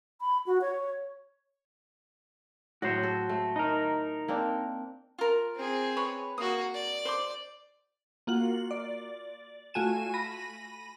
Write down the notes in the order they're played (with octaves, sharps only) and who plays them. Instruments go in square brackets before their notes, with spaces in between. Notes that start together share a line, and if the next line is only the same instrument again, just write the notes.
[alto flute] B5
F#4
C#5
[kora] A2 F#3 [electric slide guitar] F#4 C5
[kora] A4
A3
[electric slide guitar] D#4 A#4
[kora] A#3 C4 D4
[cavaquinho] F4 A#4
[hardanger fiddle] C4 G#4
[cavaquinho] B4 C#5 B5
[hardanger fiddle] A#3 F#4 [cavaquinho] D#6
[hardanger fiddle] D5
[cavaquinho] C5 C6 D6
[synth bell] A#3 F4 F#4 F#7
D5
A3 F4 F#4 G#5 D#7 E7
B5 A#6 D#7